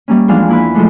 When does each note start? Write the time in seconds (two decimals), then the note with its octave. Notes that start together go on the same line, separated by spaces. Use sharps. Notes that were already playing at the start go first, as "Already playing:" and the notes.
0.08 G3 A#3 C#4
0.28 E2 F3 G#3 D4 F5
0.49 A#3 E4 B4
0.75 F3 G#3 A3 D4